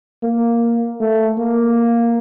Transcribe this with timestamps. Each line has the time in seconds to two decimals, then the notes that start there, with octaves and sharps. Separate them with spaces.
0.23 A#3
1.00 A3
1.38 A#3